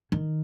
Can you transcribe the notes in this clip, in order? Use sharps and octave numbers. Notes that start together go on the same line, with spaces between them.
D#3